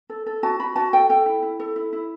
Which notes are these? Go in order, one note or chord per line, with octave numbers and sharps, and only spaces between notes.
A4
A4
F#4 A5
F#4 B5
F#4 A5
A4 G5
A4 G5
E4
E4
A4
E4
E4